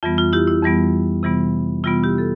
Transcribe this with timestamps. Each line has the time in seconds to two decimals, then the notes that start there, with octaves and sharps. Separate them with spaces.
0.03 F2 E3 G3 B3 F4
0.18 F4
0.33 E4 G4
0.47 E4
0.62 F2 E3 G3 B3
1.23 C3 E3 G3 B3
1.83 C3 E3 G3 B3 F4
2.03 E4 G4
2.18 A4